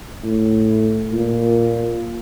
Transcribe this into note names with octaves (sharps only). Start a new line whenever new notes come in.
A2
A#2